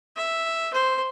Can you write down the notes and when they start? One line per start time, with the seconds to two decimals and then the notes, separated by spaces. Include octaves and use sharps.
0.17 E5
0.74 C5